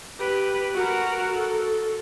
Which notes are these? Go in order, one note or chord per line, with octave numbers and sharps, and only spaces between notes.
G4 B4
F#4 A#4
A4